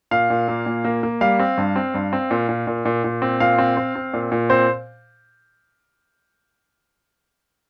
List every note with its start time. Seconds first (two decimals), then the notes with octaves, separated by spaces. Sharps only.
0.11 A#2 F5
0.30 A#2
0.48 A#3
0.66 A#2
0.85 A#3
1.03 A#3
1.21 G3 F5
1.39 C4
1.58 G2
1.76 C4
1.94 G2
2.13 C4
2.31 A#2
2.49 A#2
2.67 A#2
2.85 A#2
3.04 A#2
3.22 C4
3.40 A#2 F5
3.59 C4
3.77 C4
3.96 C4
4.14 A#2
4.32 A#2
4.50 C4 C5